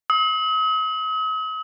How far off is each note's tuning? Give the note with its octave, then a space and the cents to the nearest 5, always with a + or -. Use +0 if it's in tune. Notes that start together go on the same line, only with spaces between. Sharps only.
D#6 +45